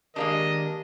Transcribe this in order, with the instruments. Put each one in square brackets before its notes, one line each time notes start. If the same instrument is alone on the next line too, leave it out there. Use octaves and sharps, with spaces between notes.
[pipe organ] D#3 [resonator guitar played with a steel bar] G#3 A#3 D4 [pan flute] G4 [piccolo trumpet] D#5